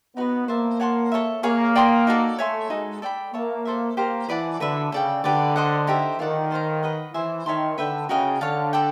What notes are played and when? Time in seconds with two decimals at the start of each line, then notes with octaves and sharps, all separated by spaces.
0.16 B3 D#4 F#4 B4
0.48 A#3 C5 E5 A5
0.80 C#5 F#5 A5 C6
1.12 A4 C#5 E5
1.43 A#3 G#4 C#5 F5
1.75 D5 G5 C6 D#6
2.07 D#4 F#4 A4 D5
2.38 A3 C#5 E5 G#5 C6
2.70 G#3 D#4 F#4 A4
3.02 A4 D5 G5 B5
3.34 A#3 C#5 E5 A5
3.65 A4 C5 E5
3.97 A#3 G4 C5 F5 A#5
4.29 E3 B4 D5 F#5 A5
4.60 D3 F#4 B4 E5
4.92 C#3 A4 D5 G5
5.24 D3 G4 B4 D5
5.56 C5 D#5 F#5
5.87 D#4 G4 C5 E5
6.19 D#3 F4 A4 D5 F#5
6.51 A4 C5 F5 A#5
6.83 B4 D#5 F#5
7.14 E3 C5 E5 G#5
7.46 D#3 C#5 E5 A5 C6
7.78 D3 B4 E5 G5
8.09 C#3 F#4 A#4 D#5 G5
8.41 D3 C#5 F5 A5
8.73 A4 D5 G5